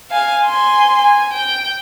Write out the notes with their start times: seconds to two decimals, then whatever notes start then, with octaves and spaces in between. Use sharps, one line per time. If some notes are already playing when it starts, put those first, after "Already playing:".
0.11 F5 G#5
0.45 G#5 C6
0.99 G#5
1.33 G5